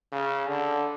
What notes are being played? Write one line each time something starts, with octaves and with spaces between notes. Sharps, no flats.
C#3
D3